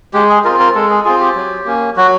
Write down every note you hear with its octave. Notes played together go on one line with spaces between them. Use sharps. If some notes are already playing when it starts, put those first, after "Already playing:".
G#3 G4
G#4
C4 F4 A#4
A#4
G#3 A4
G#4
C4 F4 G#4
G4
F#3
A#3 C#4
F#3 F#4